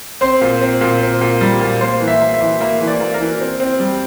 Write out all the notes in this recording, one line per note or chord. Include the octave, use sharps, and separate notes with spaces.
C4 C5
A#2
C4
A#2
C4
A#2
G3
A#2
A#3 C5
E3
E5
A#3
E5
E3
A#3 E5
E3
D5
A#3
A#4
E3
C4
C4
G3